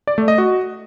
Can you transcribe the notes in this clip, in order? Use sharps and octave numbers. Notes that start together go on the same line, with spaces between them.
D5
A3
D#5
F#4